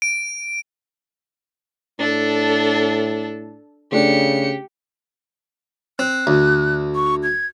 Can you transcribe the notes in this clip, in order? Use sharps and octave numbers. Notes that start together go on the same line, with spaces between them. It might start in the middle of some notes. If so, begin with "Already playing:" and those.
D7
A2 D4 A4
C#3 A3 D4 G4 C#7
C4 F#6
D2
C#6
G#6